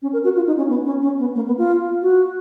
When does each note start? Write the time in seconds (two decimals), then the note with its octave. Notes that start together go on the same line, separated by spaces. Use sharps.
0.02 C#4
0.13 A#4
0.24 F#4
0.36 F4
0.47 D#4
0.57 C#4
0.69 B3
0.85 C#4
1.02 C#4
1.19 B3
1.35 A#3
1.46 B3
1.58 F4
2.02 F#4